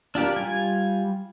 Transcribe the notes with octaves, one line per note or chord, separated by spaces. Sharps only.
D4 F4 G4 A#4
G3 F4 G#5